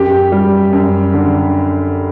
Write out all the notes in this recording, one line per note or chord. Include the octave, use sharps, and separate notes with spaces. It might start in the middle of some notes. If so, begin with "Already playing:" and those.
Already playing: F#2 G4
G3
F#2
D3